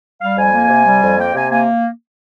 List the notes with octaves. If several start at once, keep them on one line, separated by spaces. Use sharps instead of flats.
G3 F5
F2 G#5
A#3
C3
G3
F2
A#3 G5
C3 G#5
A#3 G#5